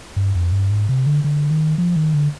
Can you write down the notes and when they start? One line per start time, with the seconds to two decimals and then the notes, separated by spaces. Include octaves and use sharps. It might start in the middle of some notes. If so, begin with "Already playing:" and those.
0.16 G2
0.35 F2
0.52 G2
0.70 G#2
0.89 C3
1.06 D3
1.24 D3
1.51 D#3
1.78 F3
1.96 D#3
2.14 D3